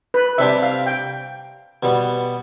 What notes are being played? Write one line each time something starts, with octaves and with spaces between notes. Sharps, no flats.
B4
C3 G3 D4 G4 E5
F5
G5
B2 G3 B3